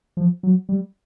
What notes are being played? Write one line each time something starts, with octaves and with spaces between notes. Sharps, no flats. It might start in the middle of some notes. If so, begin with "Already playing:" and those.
F3
F#3
G3